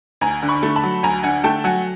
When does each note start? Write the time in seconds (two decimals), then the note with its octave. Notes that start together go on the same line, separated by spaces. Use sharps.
0.21 D2 G#5 A#5
0.42 D3
0.48 B5 C#6
0.63 A3
0.76 A5 B5
0.84 F#3
1.03 D2 G#5 A#5
1.23 D3 F#5 G#5
1.44 A3 G5 A5
1.64 F#3 F#5 G#5